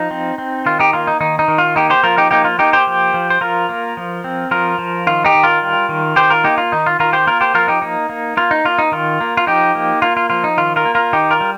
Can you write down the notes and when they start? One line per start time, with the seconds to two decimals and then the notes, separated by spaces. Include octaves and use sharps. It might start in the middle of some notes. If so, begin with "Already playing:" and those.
Already playing: F3 D#4
0.11 C4
0.38 C4
0.66 D#3 F4
0.79 D#4 G4
0.93 A#3 F4
1.07 D#4
1.20 D#3 D#4
1.39 D#4
1.48 D#3
1.58 F4
1.76 A#3 D#4 G4
1.90 G4 C5
2.03 F3 F4 A#4
2.18 D#4 G4
2.31 A#3 D#4 G4
2.45 F4
2.58 A#3 D#4 G4
2.73 G4 C5
2.87 F3
3.14 F3
3.30 C5
3.41 F3 F4 A#4
3.69 A#3
3.97 F3
4.24 C4
4.51 F3 F4 A#4
4.79 F3
5.07 D#3 F4
5.25 D#4 G4
5.35 D#3
5.43 F4 A#4
5.62 G3
5.89 D#3
6.16 D#3 G4 C5
6.30 F4 A#4
6.44 A#3 D#4 G4
6.58 F4
6.72 D#3 D#4
6.86 F4
6.99 D#3 F4 A#4
7.13 G4 C5
7.27 A#3 F4 A#4
7.41 G4 C5
7.54 F3 F4 A#4
7.68 D#4 G4
7.82 A#3 D#4
8.09 A#3
8.37 A#3 F4
8.51 D#4
8.65 A#3 F4
8.79 D#4
8.92 D#3 F4
9.21 A#3
9.37 F4
9.47 F3 D#4 G4
9.75 A#3
10.02 A#3 F4
10.17 F4
10.30 F3 F4
10.44 D#4
10.57 D#3 F4
10.76 F4 A#4
10.85 A#3
10.95 F4 A#4
11.13 D#3 D#4 G4
11.30 F4 A#4
11.41 G3